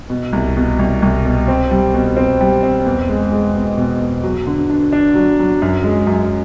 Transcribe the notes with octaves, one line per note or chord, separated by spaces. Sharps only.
B2
C2
B2
C2
C2
B2
C4
G3
B2
C4
G3
C4
E2
G#3
G#3
B2
B2
E2
F#3
D3
D4
D4
F#3
F#3
F#2
G#3
F#2